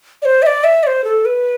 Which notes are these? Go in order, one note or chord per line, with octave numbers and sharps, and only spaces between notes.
D5
C5
E5
D5
E5
D5
C5
A4
B4